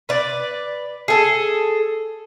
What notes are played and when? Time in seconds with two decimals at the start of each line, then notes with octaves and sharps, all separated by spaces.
0.09 B4 D5
1.08 G#4 A4